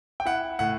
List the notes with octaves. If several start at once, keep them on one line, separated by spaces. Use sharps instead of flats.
G5
E4 F#5
A2 F#5